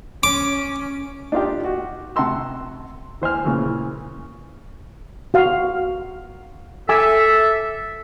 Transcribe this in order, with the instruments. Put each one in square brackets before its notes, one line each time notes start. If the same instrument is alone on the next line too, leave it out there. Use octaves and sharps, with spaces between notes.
[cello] C#4 [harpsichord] D6
[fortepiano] D4 D#4 F4 G4
F#4
C3 F#5 A5 A#5 C6 E6
E3 C5 G#5 F6
A#2 C#3 E3
[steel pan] F#4 F5
[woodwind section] A4 E5 [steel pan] G#5 D6 E6